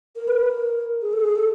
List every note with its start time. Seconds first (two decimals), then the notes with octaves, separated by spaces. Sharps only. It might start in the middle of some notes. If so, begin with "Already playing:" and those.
0.16 A#4
0.28 B4
0.40 A#4
1.02 G#4
1.13 A4
1.24 G#4
1.35 A4